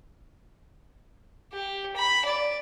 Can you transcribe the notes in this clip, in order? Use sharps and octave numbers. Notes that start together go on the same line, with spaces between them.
G4
B5
D5